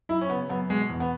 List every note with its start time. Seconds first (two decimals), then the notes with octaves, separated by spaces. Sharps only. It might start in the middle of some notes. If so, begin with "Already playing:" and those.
0.09 F#2 E4
0.21 C#4
0.29 C#3 B3
0.49 F#2 B3
0.69 B2 G#3
0.90 E2
1.00 B3